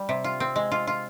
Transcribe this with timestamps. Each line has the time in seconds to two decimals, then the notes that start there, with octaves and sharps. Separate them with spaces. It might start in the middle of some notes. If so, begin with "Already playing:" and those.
Already playing: G3
0.09 C3
0.24 F4
0.40 C4
0.56 G#3
0.71 F4
0.87 F4